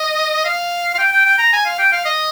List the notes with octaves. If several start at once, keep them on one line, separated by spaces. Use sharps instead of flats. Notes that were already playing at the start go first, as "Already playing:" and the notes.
Already playing: D#5
F5
F5
G5
G5
G5
A#5
G#5
F5
G5
F5
D#5